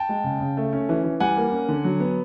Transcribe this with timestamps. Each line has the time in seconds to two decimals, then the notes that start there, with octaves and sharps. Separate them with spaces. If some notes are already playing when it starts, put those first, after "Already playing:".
Already playing: G5 A5
0.09 G#3
0.24 C#3
0.40 C#3
0.57 A3
0.73 C#4
0.89 E3
1.04 E3
1.20 G3 F#5 G#5
1.37 A#3
1.52 C#4
1.69 D3
1.84 F#3
2.00 B3